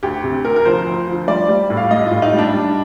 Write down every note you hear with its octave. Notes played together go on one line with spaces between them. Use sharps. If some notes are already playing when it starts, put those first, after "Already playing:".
D2 G4
C3
D2 A#4
A#4
F3 C5
D2
F3
G3 D5
G3
A2
F5
G3 D#5
F4
A2
D#4
G3
D4
G3